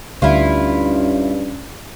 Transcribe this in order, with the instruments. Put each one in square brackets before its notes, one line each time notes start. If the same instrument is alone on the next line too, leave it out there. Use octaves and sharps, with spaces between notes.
[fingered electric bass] D2 [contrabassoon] G2 [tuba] C#4 [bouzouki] E4 F4